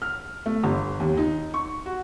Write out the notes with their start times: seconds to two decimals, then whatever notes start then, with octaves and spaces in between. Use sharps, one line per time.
0.02 F6
0.46 A3
0.64 G1
1.00 D#2
1.17 D#4
1.54 C#6
1.86 F#4